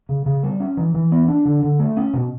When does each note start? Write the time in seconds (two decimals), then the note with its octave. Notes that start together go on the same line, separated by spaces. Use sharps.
0.09 C#3
0.26 C#3
0.43 G3
0.60 C#4
0.77 E3
0.94 E3
1.12 B3
1.28 D4
1.45 D3
1.63 D3
1.79 A3
1.97 C#4
2.13 B2